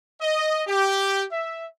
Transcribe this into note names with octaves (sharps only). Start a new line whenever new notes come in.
D#5
G4
E5